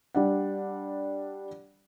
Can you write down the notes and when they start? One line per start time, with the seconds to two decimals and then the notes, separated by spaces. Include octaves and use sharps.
0.15 G3 D4 F#5